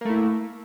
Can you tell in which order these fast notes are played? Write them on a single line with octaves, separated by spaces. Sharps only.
A#3 A3 E4